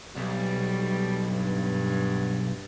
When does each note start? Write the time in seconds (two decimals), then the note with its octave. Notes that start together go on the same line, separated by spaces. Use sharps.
0.16 B1 G3
1.30 G2